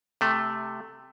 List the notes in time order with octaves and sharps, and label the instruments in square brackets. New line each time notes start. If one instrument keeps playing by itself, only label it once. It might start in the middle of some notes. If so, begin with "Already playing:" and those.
[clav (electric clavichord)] C3 A3